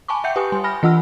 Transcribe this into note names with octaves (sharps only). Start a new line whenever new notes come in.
G#5 A5 B5 C#6 D6
E5 F#5 G5 G6 C#7
G4 B4 G5 G#5 D#6
G3 G#5 C6
G#5 B5 F6 A#6
E3 F4 F#5 E6 F6